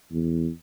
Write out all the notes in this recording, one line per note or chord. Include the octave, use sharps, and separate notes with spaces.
E2